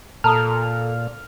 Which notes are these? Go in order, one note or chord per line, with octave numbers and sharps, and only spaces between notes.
A#2 A4 A5 A#5 D#6 F6